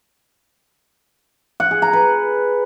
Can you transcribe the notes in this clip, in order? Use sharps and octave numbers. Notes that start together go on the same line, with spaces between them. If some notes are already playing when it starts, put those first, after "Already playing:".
F#5
G#4
A#5
B4